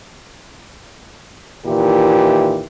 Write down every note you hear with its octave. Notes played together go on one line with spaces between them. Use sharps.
A#2 D#3 E3 E4 G4